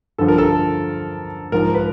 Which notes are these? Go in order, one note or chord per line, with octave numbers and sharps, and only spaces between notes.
G2 D3 F3 A4
A#4
A4
G#2 F3 A#4
B4